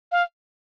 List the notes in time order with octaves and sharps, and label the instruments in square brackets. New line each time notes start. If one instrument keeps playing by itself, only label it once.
[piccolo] F5